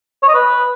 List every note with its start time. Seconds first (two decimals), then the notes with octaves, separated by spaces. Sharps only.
0.23 C#5
0.29 D#5
0.34 B4